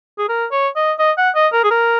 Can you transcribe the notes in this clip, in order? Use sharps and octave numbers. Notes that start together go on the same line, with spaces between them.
G#4
A#4
C#5
D#5
D#5
F#5
D#5
A#4
G#4
A#4